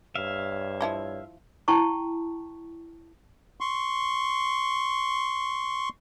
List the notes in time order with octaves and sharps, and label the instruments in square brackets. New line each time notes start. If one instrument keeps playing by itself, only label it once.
[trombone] G2 [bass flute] C#5 [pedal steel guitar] E5 F5
[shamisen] F3 E4 D#5
[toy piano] E4 G5 A5 C#6
[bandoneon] C6 C#6